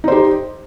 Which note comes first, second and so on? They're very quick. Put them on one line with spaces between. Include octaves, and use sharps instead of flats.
D#4 C5 G4